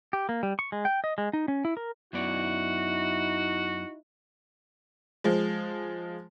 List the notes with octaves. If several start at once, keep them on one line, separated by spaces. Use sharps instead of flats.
G4
A#3
G3
C#6
G#3
G5
D#5
G#3
D#4
C#4
E4
A#4
F#2 B3 D#4 E4 F#4 D5
F3 G#3